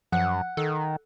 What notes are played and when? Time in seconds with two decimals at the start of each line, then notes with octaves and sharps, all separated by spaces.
0.12 F#2 F3 F#5
0.57 D#3 A4